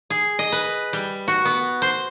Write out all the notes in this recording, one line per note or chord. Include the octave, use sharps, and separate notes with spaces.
G#4
D#5
B4
G3
F#4
B3
C5